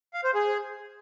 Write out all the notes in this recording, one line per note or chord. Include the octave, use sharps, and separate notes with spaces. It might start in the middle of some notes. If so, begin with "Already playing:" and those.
F5
C5
G#4